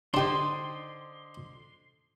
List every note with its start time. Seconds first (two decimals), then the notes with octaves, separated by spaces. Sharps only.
0.14 D3 D4 D#4 G4 C5 C6